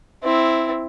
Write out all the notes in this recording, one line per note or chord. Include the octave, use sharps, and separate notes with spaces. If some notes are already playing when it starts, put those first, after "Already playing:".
C4 E4